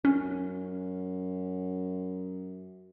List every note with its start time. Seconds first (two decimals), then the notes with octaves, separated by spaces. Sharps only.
0.05 F#2 C#4